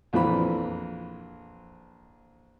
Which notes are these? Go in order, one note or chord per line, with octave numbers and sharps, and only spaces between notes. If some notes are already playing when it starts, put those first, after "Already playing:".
A#1 F2 E3 B5